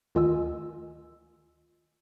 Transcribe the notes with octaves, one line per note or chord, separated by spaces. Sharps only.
D2 D#3 F4 D#5 G#5 E6